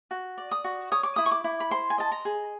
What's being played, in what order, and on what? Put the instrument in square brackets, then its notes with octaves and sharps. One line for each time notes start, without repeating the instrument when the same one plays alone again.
[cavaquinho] F#4
D5
D#6
F#4
C#5 D#6
D6
E4 D#6
C#6
D6
E4
B5
C5 C6
G#5
D#5 A5
A#5
G#4